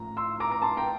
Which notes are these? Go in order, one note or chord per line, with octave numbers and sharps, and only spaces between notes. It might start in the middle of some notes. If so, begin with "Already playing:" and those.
Already playing: A1 A2 F3 A#5
C6 E6
A#5 D6
A#5
A5 C6
G5 A#5